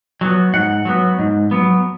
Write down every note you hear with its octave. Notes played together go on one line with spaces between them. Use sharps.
F#3 B3
G#2 F#5
F#3 B3
G#2
F#3 B3